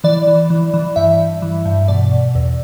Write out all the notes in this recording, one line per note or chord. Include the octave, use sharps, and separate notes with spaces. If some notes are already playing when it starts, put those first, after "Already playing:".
E3 D5
E3
E3
E3
G2 E5
G2
E3
G2
B2 D5
B2
E2